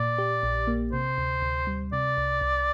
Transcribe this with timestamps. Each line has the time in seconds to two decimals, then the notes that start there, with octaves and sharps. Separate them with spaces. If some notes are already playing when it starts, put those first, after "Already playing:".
Already playing: A#2 D5
0.18 G4
0.43 A#1
0.67 A#3
0.92 C3 C5
1.18 D2
1.42 D2
1.67 G3
1.92 C3 D5
2.17 C2
2.41 C2